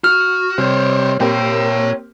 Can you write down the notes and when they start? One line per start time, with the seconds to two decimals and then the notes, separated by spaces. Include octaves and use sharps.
0.04 F#4 F6
0.58 C3 G3 C4 C5 C#5
1.20 A#2 A#3 C4 G4 C#5 G5